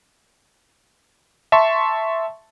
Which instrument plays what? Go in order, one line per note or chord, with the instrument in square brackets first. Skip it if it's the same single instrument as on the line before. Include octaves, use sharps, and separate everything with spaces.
[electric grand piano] E5 A5 C6 C#6